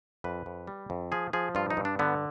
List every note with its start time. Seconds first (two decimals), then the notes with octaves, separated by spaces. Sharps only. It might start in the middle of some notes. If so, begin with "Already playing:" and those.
0.24 F2 B4
0.46 F2
0.67 G3
0.90 F2
1.12 F3 G#4
1.33 F3 G#4
1.55 G2 F4
1.70 D#4
1.77 G2
1.85 D4
1.99 D3 B3